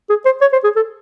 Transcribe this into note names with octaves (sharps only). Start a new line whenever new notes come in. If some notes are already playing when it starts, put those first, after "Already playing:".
G#4
C5
C#5
C5
G#4
A4